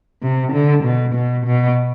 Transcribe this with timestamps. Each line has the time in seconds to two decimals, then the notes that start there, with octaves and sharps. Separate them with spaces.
0.22 C3
0.53 D3
0.84 B2
1.14 B2
1.46 B2